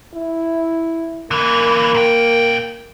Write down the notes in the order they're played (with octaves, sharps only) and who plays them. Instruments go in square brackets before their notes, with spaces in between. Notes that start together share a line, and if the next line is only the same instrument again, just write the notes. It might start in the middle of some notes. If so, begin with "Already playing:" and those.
[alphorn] E4
[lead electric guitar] D3 E3 [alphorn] A#3
[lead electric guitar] A#2 G5